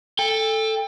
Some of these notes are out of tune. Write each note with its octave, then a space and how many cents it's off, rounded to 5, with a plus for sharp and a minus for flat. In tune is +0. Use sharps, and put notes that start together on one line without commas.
A4 +0 G5 +35